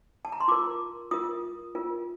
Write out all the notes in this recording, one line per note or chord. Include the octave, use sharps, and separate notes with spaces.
A5
A#5
C6
F4 A#4 D6
F4 A#4 D#6
F4 A#4